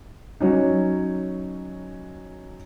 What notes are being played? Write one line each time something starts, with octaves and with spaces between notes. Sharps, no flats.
F#3 C#4 D#4